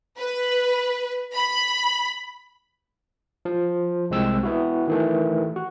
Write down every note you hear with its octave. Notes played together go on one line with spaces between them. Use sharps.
B4
B5
F3
C2 G#3 C4 E6
B3 E4 F#4
D#3 E3 A3
F#4